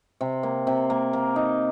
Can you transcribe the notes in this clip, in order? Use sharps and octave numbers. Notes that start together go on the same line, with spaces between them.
C3
A#3
C3
A#3
A#3
D#4